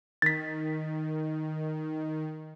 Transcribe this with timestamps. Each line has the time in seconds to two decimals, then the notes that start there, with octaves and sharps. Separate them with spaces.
0.22 D#3 A6 B6